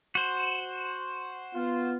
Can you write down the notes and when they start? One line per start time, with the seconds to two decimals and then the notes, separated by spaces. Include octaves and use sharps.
0.15 F#4 C5
1.54 B3 F4